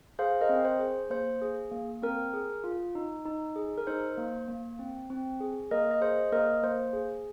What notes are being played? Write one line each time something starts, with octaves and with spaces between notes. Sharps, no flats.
G#4 C5 F5
A#4 D#5
C4
C5
G#4
A#3 C5
G#4
A#3
C4 A#4
G#4
F4
D#4
D#4
G#4
A#4
D#4 C5
A#3
A#3
C4
C4
G#4
A#3 A#4 D#5
D#5
G#4 C5
A#3 A#4 D#5
A#3 C5
G#4